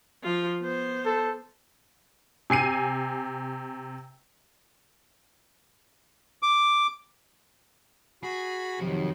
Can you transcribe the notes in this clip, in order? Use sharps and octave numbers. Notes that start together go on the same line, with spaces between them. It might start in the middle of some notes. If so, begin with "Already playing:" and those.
F3 F4
B3 C5
A4
C3 G#5 C7 D#7
D6
F#4 G#4 B5
F2 C3 D#3 F#3